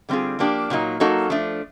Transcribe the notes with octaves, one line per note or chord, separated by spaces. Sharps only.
D3 G3 C4 F4 G#4
F3 A#3 D4 G4
A#2 F#3 A#3 D#4
F#3 A#3 D#4 F#4 A4
F3 A3 D4